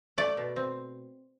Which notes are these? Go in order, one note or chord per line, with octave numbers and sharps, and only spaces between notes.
A3 D5
B2
C4